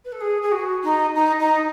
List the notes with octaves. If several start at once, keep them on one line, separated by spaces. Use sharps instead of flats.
B4
A4
G#4
G#4
F#4
D#4
D#4
D#4